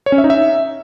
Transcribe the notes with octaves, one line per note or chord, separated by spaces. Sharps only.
C#5
C#4
E5
D#4
E5